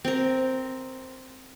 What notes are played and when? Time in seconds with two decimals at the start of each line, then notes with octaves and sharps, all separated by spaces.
0.05 C4 A#4